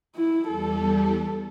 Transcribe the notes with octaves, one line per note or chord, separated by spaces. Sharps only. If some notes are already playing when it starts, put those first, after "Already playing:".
E4
E2 G3 A4